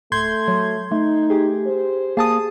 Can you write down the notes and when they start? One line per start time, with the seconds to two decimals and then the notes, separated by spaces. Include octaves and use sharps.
0.12 D1 A3 C6 G6 G#6
0.48 F#3
0.92 A3 D#4
1.30 G4 G#4
1.66 C5
2.17 A#3 G#4 A5 D#6